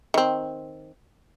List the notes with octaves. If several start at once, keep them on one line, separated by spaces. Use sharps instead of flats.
D#3 C4